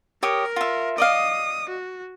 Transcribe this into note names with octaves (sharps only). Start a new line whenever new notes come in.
G4 A#4 C#5 D#6
F4 E5
D5 D#5 F5 D#6
F#4